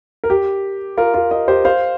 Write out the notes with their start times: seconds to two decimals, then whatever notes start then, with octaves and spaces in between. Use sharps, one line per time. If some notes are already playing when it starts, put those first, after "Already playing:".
0.24 A#4
0.30 G4
0.97 F4 A#4
1.14 F4 A#4
1.31 A#4 D#5
1.48 G4 C5
1.65 C5 F5